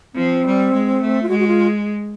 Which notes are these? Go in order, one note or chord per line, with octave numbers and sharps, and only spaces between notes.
F3 C4
G3
G#3
A3
F4
G#3 F#4
F#4
F4